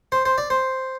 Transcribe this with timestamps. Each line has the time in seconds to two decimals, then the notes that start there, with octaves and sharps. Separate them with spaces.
0.12 C5
0.25 C5
0.38 D5
0.50 C5